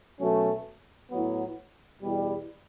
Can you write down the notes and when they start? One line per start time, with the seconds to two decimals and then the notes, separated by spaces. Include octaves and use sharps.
0.18 B2 F#3 A3 C#4
1.10 A2 F#3 B3
2.03 E2 B2 G3